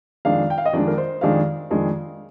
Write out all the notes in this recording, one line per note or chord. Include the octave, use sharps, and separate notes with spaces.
F2 D#3 G#3 D4 F5
G5
F5
D#5
F2 D#3 G#3 D4 D5
A#4
C5
F2 D#3 G#3 D4 F5
F2 D#3 G#3 D4